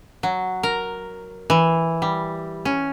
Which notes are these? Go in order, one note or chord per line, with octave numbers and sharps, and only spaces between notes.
F#3
A#4
E3
G3
C#4